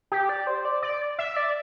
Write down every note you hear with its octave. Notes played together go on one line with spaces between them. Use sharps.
G4
D5
C5
D5
D5
E5
D5